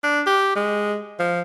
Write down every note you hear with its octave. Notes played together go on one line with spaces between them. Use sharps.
D4
G4
G#3
F3